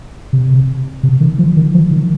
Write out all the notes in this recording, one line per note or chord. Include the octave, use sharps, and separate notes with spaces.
C3
C3
D#3
F3
D#3
F3
D#3